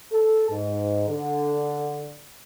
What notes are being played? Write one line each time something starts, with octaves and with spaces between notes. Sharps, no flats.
A4
G#2
D3